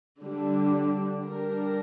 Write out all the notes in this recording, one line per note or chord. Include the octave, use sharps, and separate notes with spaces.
D3 G3 D4
G3 D4 A#4